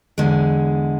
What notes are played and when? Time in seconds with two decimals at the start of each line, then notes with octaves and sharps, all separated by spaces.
0.18 E2 D3 G#3